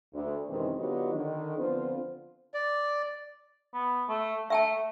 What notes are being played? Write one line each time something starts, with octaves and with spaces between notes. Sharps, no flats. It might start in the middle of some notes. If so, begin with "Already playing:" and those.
D2
F#2 C3 D#3 E3 G#3 C4
D3 F#3 B3 D#4 F4 G4
D3 D#3
D3 F3 B3 C4 F4 C5
D5
B3
A3
A3 E5 G5 A5